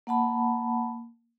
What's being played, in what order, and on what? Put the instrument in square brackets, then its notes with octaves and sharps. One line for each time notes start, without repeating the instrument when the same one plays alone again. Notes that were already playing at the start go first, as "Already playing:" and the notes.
[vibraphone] A#3 F#5 A5 B5